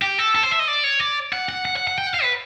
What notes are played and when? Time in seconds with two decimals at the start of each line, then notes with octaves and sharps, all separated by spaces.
0.02 G4
0.18 A4
0.35 A4
0.43 C5
0.51 E5
0.59 D#5
0.68 D5
0.84 C#5
1.00 D5
1.33 F#5
1.49 F#5
1.65 F#5
1.76 F#5
1.87 F#5
1.98 G5
2.07 F#5
2.14 F5
2.23 B4